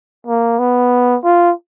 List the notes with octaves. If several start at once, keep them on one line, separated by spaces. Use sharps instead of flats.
A#3
B3
F4